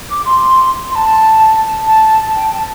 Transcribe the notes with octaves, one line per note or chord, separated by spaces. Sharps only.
D6
C6
C6
A5
A5
G5
A5